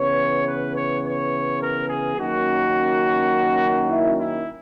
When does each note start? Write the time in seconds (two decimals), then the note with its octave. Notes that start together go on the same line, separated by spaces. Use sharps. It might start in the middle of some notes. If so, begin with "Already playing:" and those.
Already playing: C#3 E3 B3 C#5
0.46 B4
0.75 C#5
1.03 C#5
1.61 A#4
1.89 G#4
2.18 F#2 D#3 A#3 C#4 F#4
3.90 E4
4.18 E4